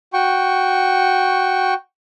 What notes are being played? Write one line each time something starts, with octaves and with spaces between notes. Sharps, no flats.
F#4 G5 C#6